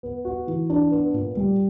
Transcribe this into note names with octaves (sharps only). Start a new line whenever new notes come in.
B3
F#4
E3
D4
B3
A#2
G3